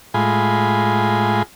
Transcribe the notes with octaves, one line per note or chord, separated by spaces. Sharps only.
A2 G#3 F4 G#5 B5